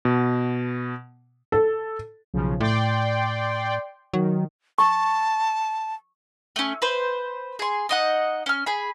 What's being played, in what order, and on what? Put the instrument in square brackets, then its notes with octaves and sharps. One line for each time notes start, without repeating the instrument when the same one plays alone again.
[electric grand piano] B2
[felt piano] A4
[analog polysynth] B1 C#3 F3
[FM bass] A2 [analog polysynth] D5 G5 C6
[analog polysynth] D#3 [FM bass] F#3
[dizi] A5 [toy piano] C#6
[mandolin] A3 C#4
B4 C5
G#4 C6
D#4 D#5 F#5
C#4 F6
G#4 B5